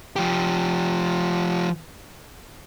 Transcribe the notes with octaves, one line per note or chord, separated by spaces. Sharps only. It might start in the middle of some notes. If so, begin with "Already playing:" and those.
F3 G4